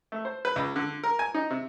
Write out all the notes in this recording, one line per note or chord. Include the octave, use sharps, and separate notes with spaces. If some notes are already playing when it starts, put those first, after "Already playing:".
A3
C5
B4
C#2
D3
A#4
G#5
D#4
C3